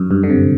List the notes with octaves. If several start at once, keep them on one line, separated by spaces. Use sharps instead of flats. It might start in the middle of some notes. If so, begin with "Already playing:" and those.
Already playing: F#2
G2
D3
C3